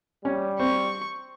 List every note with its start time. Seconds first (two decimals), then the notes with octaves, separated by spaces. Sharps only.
0.25 G3 C#4
0.60 C4 C#6